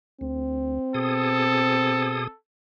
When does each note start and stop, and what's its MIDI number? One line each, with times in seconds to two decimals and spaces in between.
0.21 0.79 38
0.21 2.29 60
0.94 2.27 47
0.94 2.27 68
0.94 2.35 69
0.94 2.27 87